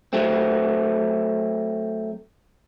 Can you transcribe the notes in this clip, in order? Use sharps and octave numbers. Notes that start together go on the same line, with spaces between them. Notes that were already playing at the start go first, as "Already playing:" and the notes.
F#3 A3 C4